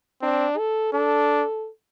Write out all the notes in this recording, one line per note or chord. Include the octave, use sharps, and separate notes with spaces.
C4 D4
A4
D4 A4